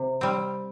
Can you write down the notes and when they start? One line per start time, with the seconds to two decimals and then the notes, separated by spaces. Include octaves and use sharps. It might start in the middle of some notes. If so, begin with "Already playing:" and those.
Already playing: C3
0.21 G3 C4